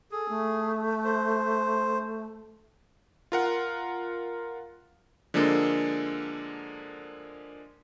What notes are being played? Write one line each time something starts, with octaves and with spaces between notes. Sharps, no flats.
G#4 A4
A3
C5
F4 A#4 F#5
D3 F3 G#3 A#3 A4